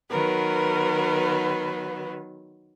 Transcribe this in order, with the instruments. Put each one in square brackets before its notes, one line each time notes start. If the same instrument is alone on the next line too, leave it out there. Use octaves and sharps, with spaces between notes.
[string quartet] D#3 F#3 B3 [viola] A#4 [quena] B4